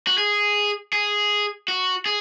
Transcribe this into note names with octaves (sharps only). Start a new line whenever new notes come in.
F#4
G#4
G#4
F#4
G#4